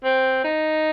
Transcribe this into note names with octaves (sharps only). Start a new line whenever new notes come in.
C4
D#4